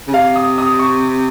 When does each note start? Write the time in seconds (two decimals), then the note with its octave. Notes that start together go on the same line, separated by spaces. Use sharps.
0.07 C#3
0.14 C3 F5
0.36 D#6
0.58 D#6
0.79 C#6